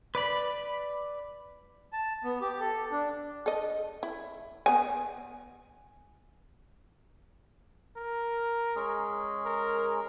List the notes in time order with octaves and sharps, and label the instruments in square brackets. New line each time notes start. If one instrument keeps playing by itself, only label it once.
[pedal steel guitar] B4 D5 B5
[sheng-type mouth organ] A5
B3
G4
A4
D4
[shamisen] A4 D#5
E4
B3 G#5
[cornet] A#4
[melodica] G#3 C#4 G#4
[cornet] A#4